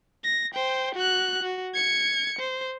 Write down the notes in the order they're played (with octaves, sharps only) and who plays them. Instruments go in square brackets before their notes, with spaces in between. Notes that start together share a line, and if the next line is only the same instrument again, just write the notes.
[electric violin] A#6
C5 G5
F#4 F#6
F#4
G#6 C#7
C5